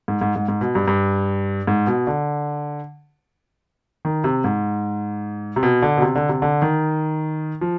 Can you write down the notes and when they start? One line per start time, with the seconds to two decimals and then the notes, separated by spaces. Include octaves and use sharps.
0.08 G#2
0.21 G#2
0.36 G#2
0.48 G#2
0.61 B2
0.75 G2
0.88 G2
1.67 G#2
1.87 B2
2.07 D3
4.05 D#3
4.24 C3
4.44 G#2
5.56 C3
5.63 B2
5.83 D3
5.97 B2
6.02 C3
6.16 D3
6.29 C3
6.42 D3
6.62 D#3
7.61 F3